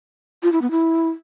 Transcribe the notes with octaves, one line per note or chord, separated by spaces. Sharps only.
F4
E4
B3
E4